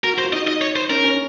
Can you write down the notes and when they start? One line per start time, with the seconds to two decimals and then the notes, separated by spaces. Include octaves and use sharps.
0.04 F#4 A#4
0.14 F#4
0.18 C5
0.23 F4
0.33 D#4 D#5
0.47 D#5
0.61 C#5
0.76 C5
0.90 C#4 A#4
1.04 C#4